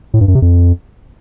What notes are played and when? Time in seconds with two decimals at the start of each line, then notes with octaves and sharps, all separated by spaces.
0.14 A2
0.21 G2
0.28 F#2
0.35 C3
0.42 F2